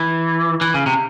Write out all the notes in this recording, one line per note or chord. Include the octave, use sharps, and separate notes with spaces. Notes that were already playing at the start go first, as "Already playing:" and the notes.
Already playing: E3
E3
C#3
C3